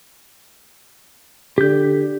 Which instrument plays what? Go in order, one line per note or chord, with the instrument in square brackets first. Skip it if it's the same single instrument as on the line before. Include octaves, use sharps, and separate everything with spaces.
[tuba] D3 [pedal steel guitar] G4 G6